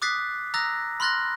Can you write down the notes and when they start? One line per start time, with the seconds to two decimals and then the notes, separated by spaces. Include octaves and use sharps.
0.02 D6 D#6 F#6 A6 B6 C7
0.54 A#5 D#6 E6 F#6 A6 A#6
1.00 B5 C6 F6 F#6 A6 A#6